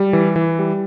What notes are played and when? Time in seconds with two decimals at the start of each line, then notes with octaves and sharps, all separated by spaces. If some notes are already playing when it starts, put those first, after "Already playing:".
Already playing: G3
0.13 E3
0.36 E3
0.59 G3